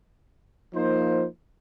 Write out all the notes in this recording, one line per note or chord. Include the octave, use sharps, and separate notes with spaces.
F3 A#3 D#4 C5